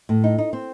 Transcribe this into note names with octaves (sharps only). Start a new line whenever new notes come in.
A2
D#4
D#4
C4